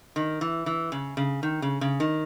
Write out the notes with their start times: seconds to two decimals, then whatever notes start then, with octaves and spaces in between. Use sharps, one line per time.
0.16 D#3
0.41 E3
0.66 E3
0.92 C#3
1.17 C#3
1.43 D#3
1.62 C#3
1.81 C#3
2.00 D#3